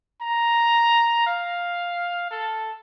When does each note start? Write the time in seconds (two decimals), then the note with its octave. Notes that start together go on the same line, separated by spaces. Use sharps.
0.21 A#5
1.27 F5
2.31 A4